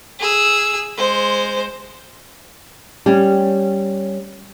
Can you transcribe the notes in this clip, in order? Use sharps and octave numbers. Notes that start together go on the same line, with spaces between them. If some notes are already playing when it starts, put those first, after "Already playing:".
G#4 E6
G#3 C5
G3 C#4